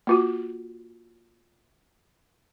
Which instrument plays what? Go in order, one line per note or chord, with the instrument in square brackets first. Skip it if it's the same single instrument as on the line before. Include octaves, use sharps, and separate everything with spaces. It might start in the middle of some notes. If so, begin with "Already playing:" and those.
[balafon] A#3 F4 F#4